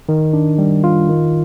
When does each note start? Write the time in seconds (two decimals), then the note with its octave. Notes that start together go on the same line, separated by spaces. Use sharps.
0.09 D#3
0.33 D4
0.58 G3
0.84 F4
1.09 D#3